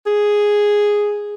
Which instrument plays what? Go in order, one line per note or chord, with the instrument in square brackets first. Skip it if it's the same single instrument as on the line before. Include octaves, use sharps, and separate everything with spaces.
[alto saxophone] G#4